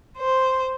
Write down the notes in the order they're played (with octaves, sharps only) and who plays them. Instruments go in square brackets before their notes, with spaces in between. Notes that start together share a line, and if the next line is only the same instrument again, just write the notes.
[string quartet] C5